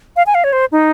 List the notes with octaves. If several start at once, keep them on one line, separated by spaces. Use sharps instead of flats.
F5
G#5
F5
C#5
C5
D#4